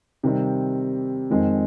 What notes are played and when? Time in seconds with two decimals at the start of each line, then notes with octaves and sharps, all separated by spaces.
0.23 C3 D#3 G3 C4
1.30 F2 D#3 G#3 C4